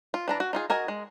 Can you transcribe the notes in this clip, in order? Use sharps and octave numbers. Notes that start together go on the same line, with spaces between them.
F4
E3 D4 A#5
F#4
D#4 F4 G#4
F#4 A#4 D#5 G#5
G#3